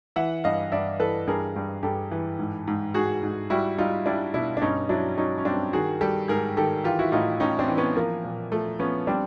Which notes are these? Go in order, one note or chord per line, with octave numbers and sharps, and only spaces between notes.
E3 E5 F#5
G2 D#5 F5
G2 D5 E5
E3 A4 B4
G2 G#4 A#4
G2
G2 G4 A4
E3
G#2
G#2
G#2 F#4 G#4
G#2
G3 E4 F#4
G3 D#4 F4
G3 D4 E4
B2 D4 E4
D4
G2 C#4 D#4
F#3 D4 E4
F#3 C#4 D#4
C#4
G2 C4 D4
D#3 F#4 G#4
G3 G4 A4
G#2 G#4 A#4
D#3 G4 A4
E3 F4 G4
E4 F#4
A2 D#4 F4
A2 C#4 D#4
C4 D4
E3
B3 C#4
F3 A#3
A#2
F3 A3
F3 B3 C#4
G3 C4 D4